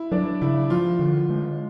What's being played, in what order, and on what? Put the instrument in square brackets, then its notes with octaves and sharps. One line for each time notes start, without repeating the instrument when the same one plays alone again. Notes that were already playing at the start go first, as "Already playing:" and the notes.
Already playing: [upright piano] E4
[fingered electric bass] F#3 [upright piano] D4
[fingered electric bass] C#3 [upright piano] E4
[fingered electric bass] F3 [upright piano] F4
[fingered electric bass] D3
G#3